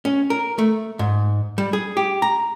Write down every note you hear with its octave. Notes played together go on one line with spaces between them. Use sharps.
C#4
A#4
A3
G#2
G3
G#4
G4
A#5